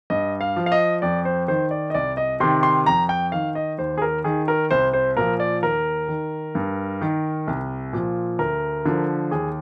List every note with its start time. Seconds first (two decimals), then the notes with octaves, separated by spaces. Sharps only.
0.10 G2 D#5
0.41 F5
0.56 F3
0.66 F5
0.72 D#5
1.02 F2 D5
1.25 C5
1.48 D#3 C5
1.71 D5
1.90 D#5
1.94 C2 D5
2.17 D#5
2.40 C3 D#3 C6
2.63 C6
2.86 F2 A#5
3.09 G5
3.32 D#3 F5
3.55 D#5
3.78 D#2 C5
3.98 G#4
4.02 A#4
4.24 D#3 G#4
4.48 A#4
4.71 C2 C5
4.93 C5
5.17 A#2 F3 A#4
5.40 D5
5.63 D#2 A#4
6.08 D#3
6.55 G2
7.01 D#3
7.47 C2
7.93 A#2 F3
8.39 D2 A#4
8.86 D3 F3
9.31 D#2 G#4